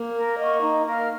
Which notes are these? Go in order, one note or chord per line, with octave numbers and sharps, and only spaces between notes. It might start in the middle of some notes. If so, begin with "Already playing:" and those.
Already playing: A#3
A#4
D#5 F#5 C#6
D#4
A#4 F5